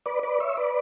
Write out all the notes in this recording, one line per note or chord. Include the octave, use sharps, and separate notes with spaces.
B4 D5
B4 D5
C#5 E5
B4 D5